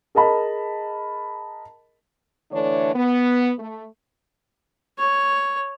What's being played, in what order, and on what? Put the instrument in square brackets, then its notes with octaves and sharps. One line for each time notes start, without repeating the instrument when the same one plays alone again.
[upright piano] G#4 A#4 D#5 A5 B5
[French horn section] D3 E3 A3 D4 C#5
B3
A3
[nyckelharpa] C#5